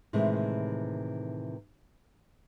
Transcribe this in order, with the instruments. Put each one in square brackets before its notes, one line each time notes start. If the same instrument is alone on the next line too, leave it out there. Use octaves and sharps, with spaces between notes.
[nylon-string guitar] A2 C3 D#3 E3 G#3